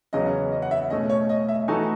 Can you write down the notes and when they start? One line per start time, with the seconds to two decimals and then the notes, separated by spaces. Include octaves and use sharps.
0.13 E2 C#3 F#3 C#4 G#4 D#5
0.52 D#5
0.62 F#5
0.71 E5
0.90 B2 A3 C#4 D#5
1.09 C#5
1.29 D#5
1.49 E5
1.68 E3 A3 D#4 F#4 A4 G#5